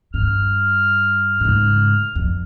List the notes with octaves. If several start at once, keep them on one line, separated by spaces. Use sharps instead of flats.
G2 F6
G#2 C#3
F2